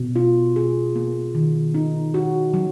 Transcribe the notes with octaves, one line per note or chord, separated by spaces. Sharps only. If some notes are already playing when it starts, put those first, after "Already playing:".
Already playing: B2
F4
G#4
A#3
D#3
D#4
F#4
F#3